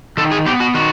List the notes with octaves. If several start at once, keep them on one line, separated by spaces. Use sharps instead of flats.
D#3 A4
G#4
B3 G4
F#4
D#3 F#4